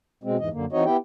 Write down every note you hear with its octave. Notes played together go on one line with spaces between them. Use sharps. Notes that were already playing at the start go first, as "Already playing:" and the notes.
B2 G#3 C4
E2 G#2 E3 D#5
F#2 D3 A#3
E3 C4 D#4 F#4 C#5 D#5
B3 E4 G4 G5